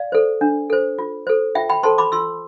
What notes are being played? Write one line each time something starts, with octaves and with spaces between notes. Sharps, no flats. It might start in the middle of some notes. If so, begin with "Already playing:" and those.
Already playing: D5 F5
A4 C5
D4
A4 C5
F4
A4 C5
F4 E5 G5
G5 B5
A4 C5 A5 C6
B5 D6
F4 C6 E6